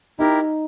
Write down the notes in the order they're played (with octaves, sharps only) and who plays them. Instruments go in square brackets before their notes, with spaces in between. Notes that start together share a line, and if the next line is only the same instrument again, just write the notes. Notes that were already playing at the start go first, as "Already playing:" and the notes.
[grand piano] D#4 [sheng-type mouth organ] E4 G4 A#4